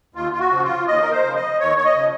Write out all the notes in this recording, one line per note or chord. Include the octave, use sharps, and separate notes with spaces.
D#2 F4
F4
F#4
C#3 F3
F4
D#2 D#5
A#4
C5
C#3 F3
D#5
D#2 C#5
C#5
D#5
C#3 F3